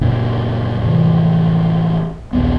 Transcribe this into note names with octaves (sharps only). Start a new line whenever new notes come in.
F#1 A#2 D3
A2 C3 E3 F3
A#1 D#2 B3